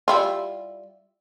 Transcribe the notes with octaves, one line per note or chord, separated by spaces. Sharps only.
G3 E4 F4